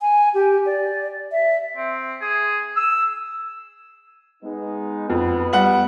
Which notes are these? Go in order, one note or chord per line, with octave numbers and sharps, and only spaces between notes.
G#5
G4
D5
E5
C4
G#4
E6
G#3 B3 D#4
F2 B3
G3 F#5 F#7